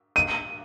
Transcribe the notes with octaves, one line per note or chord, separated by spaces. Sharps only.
D#7